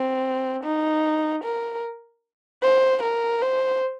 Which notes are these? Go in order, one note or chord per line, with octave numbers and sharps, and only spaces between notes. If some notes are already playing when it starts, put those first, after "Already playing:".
Already playing: C4
D#4
A#4
C5
A#4
C5